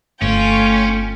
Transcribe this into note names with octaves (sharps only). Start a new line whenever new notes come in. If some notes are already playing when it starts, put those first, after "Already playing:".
G1 A3 C#4 F4 G5